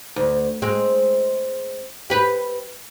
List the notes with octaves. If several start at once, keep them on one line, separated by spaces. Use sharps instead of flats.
D2
G#3 C4
G4 B4